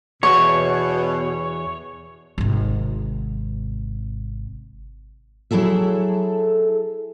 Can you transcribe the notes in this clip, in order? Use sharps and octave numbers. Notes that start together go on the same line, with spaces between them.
E2 B2 C#5 C#6
G#1 C3
F#3 E4 G#4 A4 E5